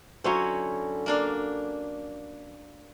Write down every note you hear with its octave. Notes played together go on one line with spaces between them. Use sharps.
D3 F#3 C#4 E4 C5
A#3 D4 F5